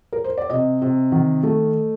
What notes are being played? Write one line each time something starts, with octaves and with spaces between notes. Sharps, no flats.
A#4
C5
D5
C3 D#5
C3
D#3
A3